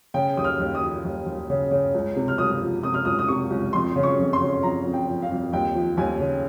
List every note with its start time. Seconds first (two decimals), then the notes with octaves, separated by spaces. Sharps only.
0.14 C#3 G5
0.37 D#2 D#6
0.44 F6
0.59 D#2
0.75 D#6
0.82 F3
1.05 D#2
1.26 D#2
1.50 C#3
1.71 C#3
1.94 C#2
2.16 C3
2.28 F6
2.38 C#2 D#6
2.61 F3
2.83 C3 D#6
2.94 F6
3.05 C#2 D#6
3.19 D#6
3.28 C3 C#6
3.50 C#2
3.73 F2 C6
3.96 C#3
4.03 C#6
4.19 F2
4.33 C6
4.40 C#3
4.63 F2 A#5
4.86 F2
4.93 G5
5.08 F3
5.22 F5
5.31 F2
5.53 D#2 G5
5.75 F3
5.97 D#2 G#5
6.20 C#3